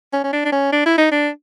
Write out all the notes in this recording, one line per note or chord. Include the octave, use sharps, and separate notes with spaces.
C#4
C#4
D4
D4
C#4
D4
E4
D#4
D4